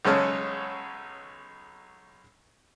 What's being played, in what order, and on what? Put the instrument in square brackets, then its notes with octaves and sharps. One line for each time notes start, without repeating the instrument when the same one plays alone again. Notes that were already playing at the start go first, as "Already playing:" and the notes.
[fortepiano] B1 C#3 G#3 A4 C#5 F6